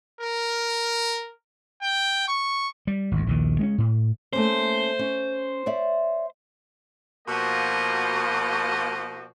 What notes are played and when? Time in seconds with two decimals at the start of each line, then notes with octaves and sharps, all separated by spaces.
0.21 A#4
1.82 G5
2.28 C#6
2.87 G3
3.11 G#1 D2
3.27 A#1 D#2 D#3
3.59 G#3 A#3 C#4
3.78 A2
4.33 A3 A#3 C#4 C5
4.99 C#4
5.66 C#5 D5 E5
7.27 B2 F3 A#3 F#4 G4 D#5